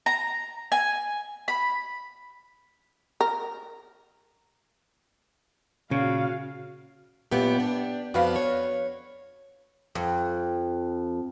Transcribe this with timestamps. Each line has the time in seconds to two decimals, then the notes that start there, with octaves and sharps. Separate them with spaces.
0.06 A#5
0.72 G#5
1.48 B5
3.21 A#4
5.91 A#2 C#3 F#4 F5
7.31 F#2 A#2 B3 G4
7.60 D4
8.14 F2 B3 F#4 B4 D5 F5
8.36 C#5
9.95 F2